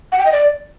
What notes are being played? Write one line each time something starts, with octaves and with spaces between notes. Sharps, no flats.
F#5
G5
D#5
D5